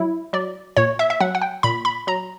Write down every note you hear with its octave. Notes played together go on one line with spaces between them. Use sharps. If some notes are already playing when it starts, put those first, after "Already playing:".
Already playing: F#3 E4
F#3 D5
A#2 C#5
E5
E5
F#3 F#5
F#5
G5
A#2 B5
B5
F#3 A#5